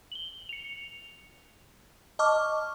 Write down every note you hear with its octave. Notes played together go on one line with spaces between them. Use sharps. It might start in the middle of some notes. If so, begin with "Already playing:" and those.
F#7 G7
C#7 F7
D#5 A5 C#6 D6 F6